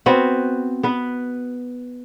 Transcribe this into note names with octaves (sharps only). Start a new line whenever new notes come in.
B3 C4 F#4 B4
B3 B4